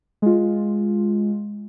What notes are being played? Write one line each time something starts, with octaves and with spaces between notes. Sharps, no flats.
G#3 F4